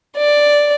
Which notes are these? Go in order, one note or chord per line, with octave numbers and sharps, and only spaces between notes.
D5